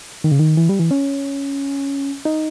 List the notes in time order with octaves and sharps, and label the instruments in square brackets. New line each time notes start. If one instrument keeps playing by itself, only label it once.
[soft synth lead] D#3
C#3
D#3
E3
G3
E3
C#4
D#4